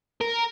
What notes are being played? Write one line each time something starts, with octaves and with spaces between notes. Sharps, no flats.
A#4